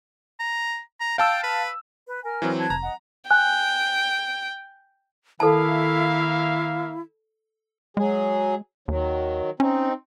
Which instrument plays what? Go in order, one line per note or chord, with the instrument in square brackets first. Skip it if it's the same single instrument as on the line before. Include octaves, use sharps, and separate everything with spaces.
[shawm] A#5
A#5
[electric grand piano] F5 A5 E6 [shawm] G5
[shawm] B4
[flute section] B4
A#4 G#5 F6
[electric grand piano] E3 F#3 C4
[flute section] B4 A5 G#6
[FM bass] F1 [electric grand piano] A#5
[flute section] D#5 F#5
[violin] G5 [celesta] G#5 F#6
[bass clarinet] D#3 [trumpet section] A#3 E5 F5 [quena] E4 [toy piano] A4 A5
[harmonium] F#3 G#4 [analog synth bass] G#3
[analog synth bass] D#2 [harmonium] D#3 F#3
[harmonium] C4 D#4 [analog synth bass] C#4